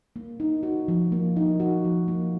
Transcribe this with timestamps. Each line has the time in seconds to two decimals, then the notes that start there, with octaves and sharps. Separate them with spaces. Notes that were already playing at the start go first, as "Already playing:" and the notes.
0.16 A#3
0.40 D#4
0.63 F#4
0.88 F3
1.12 A#3
1.36 D#4
1.60 F#4
1.84 F3
2.08 A#3